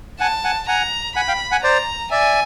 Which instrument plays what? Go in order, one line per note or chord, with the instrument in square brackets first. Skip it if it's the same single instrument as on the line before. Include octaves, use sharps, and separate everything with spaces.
[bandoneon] F#5 G#5 [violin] A5
[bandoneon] F#5 G#5
[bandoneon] F#5 G#5 [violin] A#5
[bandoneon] F#5 G#5 [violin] B5
[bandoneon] F5 G5
F#5 G#5
[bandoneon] C5 D5 [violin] A#5
[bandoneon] D5 E5 [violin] G#5